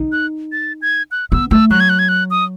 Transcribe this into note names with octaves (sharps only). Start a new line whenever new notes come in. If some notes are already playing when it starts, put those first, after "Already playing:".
Already playing: D#4
F#6
A6
G#6
F#6
B3 E6
A3 E6
F#3 F#6
G#6
F#6
G#6
F#6
D#6